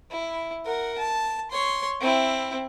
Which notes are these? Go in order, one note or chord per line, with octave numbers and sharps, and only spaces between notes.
E4
A#4 F#5
A5
C#5 C6
C4 E4